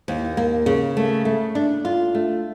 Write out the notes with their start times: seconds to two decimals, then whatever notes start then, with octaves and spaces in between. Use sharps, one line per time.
0.08 D#2
0.37 A#3
0.66 C#3
0.97 A3
1.25 A3
1.55 D4
1.85 F4
2.15 A3